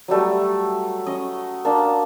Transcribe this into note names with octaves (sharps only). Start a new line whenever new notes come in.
F#3 G3 A3 G5
C#4 D#5
A#3 D4 A5